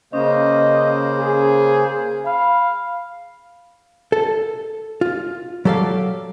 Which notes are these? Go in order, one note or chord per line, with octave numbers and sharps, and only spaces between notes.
C#3 A#3 C#4 C5 D#5
G#4
F5 B5
A4
F4
F#3 G4 A4 D5 F5